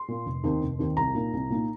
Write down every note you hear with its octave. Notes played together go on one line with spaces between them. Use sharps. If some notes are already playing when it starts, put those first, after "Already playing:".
Already playing: C6
A#2 A#3
F1
D#2 D#3 C4 D#4
F1
D#2 D#3 C4 D#4
C2 A#5
A#2 A#3 D#4
C2
A#2 A#3 D#4